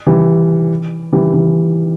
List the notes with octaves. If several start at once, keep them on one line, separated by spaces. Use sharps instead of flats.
E3 G3
E3 G3
E3